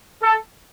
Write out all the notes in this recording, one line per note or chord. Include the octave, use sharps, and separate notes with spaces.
A4